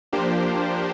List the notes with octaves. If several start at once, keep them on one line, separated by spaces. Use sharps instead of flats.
F3 A#3 D4 G4 C5